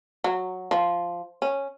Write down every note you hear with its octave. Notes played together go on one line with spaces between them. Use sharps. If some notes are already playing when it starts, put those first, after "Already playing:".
F#3
F3
C#4